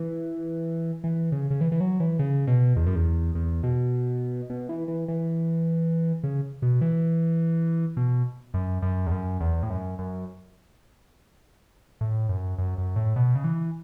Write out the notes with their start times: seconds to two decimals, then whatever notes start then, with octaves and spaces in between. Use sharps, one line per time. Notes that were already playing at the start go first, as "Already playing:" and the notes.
Already playing: E3
1.04 E3
1.32 C#3
1.50 C#3
1.61 E3
1.72 E3
1.80 F#3
2.00 E3
2.19 C#3
2.47 B2
2.76 E2
2.86 F#2
2.96 E2
3.35 E2
3.63 B2
4.50 B2
4.69 E3
4.88 E3
5.08 E3
6.24 C#3
6.62 B2
6.81 E3
7.97 B2
8.54 F#2
8.82 F#2
9.07 E2
9.12 F#2
9.40 E2
9.63 A2
9.70 F#2
9.99 F#2
12.01 A2
12.29 F#2
12.58 F#2
12.78 F#2
12.96 A2
13.16 B2
13.35 C#3
13.44 E3